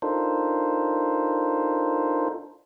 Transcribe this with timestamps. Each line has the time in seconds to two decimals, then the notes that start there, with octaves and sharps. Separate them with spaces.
0.02 D4 D#4 F4 A4 A#4 C5